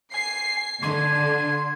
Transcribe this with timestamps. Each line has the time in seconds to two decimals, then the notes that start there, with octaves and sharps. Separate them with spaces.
0.14 G#5 C7
0.83 D3 C6 G#6